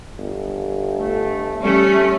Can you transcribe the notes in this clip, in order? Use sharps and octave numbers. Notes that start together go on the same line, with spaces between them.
G1
A3
G3 A3 C#4